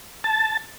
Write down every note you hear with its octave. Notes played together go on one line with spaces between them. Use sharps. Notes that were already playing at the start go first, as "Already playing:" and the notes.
A5